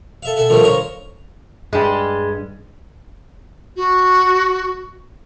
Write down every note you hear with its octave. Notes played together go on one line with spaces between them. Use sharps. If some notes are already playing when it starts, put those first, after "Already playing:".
A4 E5 F5
A4 E5 F#5 G#5
A#2 D3 D#3 F3 G3 A3
A#4 C5 C#5 D#5 F5 A#5
G2 G3 G#3
F#4